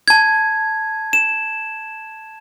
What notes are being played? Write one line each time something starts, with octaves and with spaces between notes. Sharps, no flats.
A5 G#6
E7